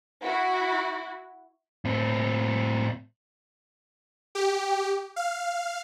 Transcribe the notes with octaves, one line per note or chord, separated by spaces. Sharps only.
E4 F#4
A2 C4
G4
F5